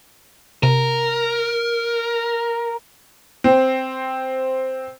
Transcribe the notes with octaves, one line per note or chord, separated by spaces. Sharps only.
C3 A#4
C4